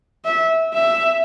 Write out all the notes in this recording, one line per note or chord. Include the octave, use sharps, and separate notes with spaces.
E5
E5